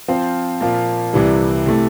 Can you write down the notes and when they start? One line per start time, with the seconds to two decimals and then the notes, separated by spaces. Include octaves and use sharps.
0.08 F3 C4 F4 C5
0.61 A#2 F3 A#3 F4
1.13 C2 C3 E3 G3
1.66 C3 E3 A3